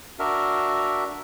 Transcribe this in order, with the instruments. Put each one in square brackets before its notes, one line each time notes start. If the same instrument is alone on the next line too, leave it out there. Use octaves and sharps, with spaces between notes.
[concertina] D4 F#4 A#4 E5 F6